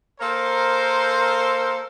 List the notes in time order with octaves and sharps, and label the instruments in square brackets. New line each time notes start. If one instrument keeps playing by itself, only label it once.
[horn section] A#3 A4 A#4 C5